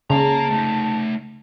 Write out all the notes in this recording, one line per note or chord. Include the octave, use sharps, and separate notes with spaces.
C#3 A#3 A5 A#5
A3 D#4